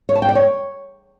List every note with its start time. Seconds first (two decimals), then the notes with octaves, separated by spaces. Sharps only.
0.09 C#5
0.15 A5
0.22 G5
0.29 D5
0.35 C#5